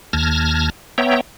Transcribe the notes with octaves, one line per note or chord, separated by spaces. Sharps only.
D#2 A5 F6 G#6 A#6
B3 C#5 E5 G5 A#5